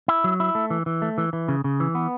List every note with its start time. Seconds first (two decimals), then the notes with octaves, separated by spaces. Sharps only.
0.08 E4
0.24 F#3
0.40 E4
0.55 A3
0.70 E3
0.86 E3
1.02 A3
1.18 E3
1.33 E3
1.48 C#3
1.64 C#3
1.80 E3
1.95 B3